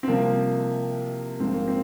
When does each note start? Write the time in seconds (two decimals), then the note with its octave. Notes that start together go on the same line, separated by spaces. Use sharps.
0.03 C4
0.07 C2 C3 F3 A#3
1.40 A#1 G#2 F3 C4
1.53 A#3
1.68 C4